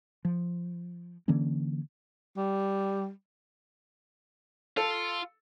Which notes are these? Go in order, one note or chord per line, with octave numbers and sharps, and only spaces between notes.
F3
D3 E3 A#3 C#4
G3
F4 A4